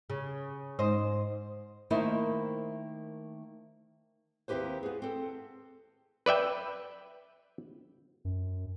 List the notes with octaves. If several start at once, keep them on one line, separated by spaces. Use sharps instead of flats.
C#3
G#2 C5 D#5
D#3 A3 A#3 D#4 E4 C5
D#2 C4 E4 G4 B4 C5
B3 G#4
C4 A4
B4 D5 E5 G5
F#2